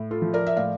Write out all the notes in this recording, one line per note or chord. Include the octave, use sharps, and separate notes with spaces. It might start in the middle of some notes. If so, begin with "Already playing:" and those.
Already playing: A2
F4 A4
F3
A#4 D5
E5
A2 D5 F5